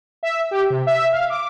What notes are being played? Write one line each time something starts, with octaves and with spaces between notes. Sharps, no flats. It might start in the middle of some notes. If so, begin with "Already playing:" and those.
E5
G4
C3
E5
F5
D6